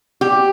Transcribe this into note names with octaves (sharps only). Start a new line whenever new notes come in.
G4